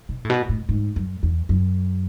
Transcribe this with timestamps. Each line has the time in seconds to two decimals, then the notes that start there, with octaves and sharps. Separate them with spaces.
0.09 B2
0.25 A2
0.30 B2
0.49 A2
0.69 G#2
0.96 F#2
1.23 E2
1.49 F#2